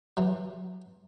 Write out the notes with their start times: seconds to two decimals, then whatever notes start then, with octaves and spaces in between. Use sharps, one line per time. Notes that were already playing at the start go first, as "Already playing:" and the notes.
0.17 E3 F#3